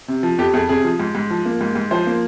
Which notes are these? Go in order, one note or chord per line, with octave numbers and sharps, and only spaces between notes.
C3
F3
F2 G4
F2 G#4
C3 G#4
F3
G#2
G#2
F3
A#3
G#2
G#2
F3 C5
A#3